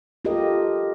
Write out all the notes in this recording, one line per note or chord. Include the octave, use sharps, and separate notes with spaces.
F4 G4 A4 A#4 D#5